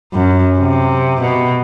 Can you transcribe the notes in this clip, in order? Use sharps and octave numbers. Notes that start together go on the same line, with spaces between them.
F#2
C3
B2